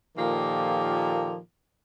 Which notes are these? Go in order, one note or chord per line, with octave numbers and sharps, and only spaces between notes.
A#2 D#3 F3 A#3 G4 A4